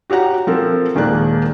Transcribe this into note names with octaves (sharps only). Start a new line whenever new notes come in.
F#4 G4 C#5 F#5 A#5
F3 C4 A4 A#4
D#1 D#3 G#3 A#3 D5 F#6